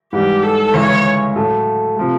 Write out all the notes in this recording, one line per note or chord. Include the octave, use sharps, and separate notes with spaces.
G#2 E3 G3 G4
A4
D2 C#3 E3 G#3 C#4 C#5
A2 F#3 A3
C3 F3 A3